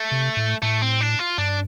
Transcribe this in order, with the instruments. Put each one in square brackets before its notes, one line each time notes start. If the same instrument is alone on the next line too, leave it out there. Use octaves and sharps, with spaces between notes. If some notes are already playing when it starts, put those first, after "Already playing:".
Already playing: [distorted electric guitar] A3
[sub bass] C3
A2
[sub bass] A2 [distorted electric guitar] A3
[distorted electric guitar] C4
D4
F4
[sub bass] G2 [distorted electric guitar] D4